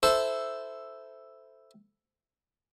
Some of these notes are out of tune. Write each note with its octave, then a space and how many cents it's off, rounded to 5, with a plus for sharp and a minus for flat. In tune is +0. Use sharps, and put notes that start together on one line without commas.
E4 +0 A4 +0 C5 -10